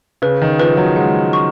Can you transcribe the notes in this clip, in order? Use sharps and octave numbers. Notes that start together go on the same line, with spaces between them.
C#3 B4
D#3
F3 B4
F#3
G#3 F#5
C#6